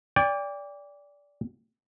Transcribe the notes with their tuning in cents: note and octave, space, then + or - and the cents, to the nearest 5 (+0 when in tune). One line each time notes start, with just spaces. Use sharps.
D5 -20 G5 +35